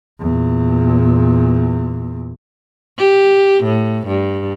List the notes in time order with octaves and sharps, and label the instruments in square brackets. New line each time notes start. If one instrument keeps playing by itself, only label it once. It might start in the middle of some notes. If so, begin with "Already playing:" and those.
[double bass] E2 A#2
[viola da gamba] G4
A2
G2